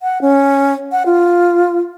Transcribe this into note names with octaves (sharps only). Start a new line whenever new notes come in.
F#5
C#4
F#5
F4